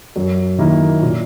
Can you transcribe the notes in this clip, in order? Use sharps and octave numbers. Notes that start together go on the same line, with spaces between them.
F#2
D#3 A#3 E4
A#2